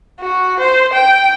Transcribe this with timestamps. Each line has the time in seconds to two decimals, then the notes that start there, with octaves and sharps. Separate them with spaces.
0.21 F#4
0.59 C5
0.93 G5